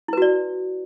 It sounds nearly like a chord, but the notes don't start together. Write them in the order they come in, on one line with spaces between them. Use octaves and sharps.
E4 B4 F#4 D5